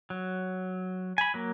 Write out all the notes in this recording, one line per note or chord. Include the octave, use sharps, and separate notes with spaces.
F#3
G#5 B5
F#3 A#3